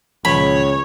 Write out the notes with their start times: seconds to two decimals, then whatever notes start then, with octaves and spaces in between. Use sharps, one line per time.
0.25 C#2 A#2 D#3 F3 C#5 B5